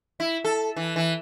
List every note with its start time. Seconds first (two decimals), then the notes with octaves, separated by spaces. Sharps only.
0.20 E4
0.45 A4
0.76 E3
0.96 E3